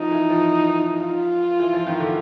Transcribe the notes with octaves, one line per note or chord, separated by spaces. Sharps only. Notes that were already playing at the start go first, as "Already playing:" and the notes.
Already playing: F3 D#4
E3
F3
F4
E3
F3
D#3
D3